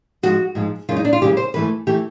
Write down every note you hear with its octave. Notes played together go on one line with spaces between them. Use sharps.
G#2 F3 G#3 F#4
G#2 F3 G#3
F#2 C#3 E3 G#3 F4
D#4
D4
F4
F#2 C#3 E3 G#3 G4
C5
G#2 E3 A3 B4
E3 A3 G4